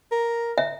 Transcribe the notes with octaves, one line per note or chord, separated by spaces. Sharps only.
A#4
E5